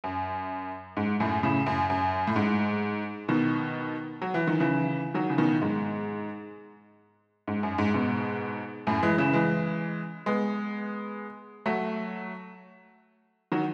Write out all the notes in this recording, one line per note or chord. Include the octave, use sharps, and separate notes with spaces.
F#2
G#2
F#2 A2
A2 C#3
F#2
F#2
A2
G#2
B2 D#3
F#3
E3
D#3
C#3 E3
D#3 F#3
C#3
B2 D#3
G#2
G#2
F#2
G#2
G#2 B2
F#2 A2
E3 G#3
C#3 E3
E3 G#3
G#3 B3
F#3 A3
D#3 F#3